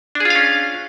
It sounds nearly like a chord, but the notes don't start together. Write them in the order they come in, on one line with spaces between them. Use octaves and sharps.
D4 G#4 F4 F5 C#4